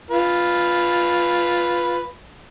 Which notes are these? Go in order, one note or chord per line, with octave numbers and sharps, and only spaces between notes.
F4 B4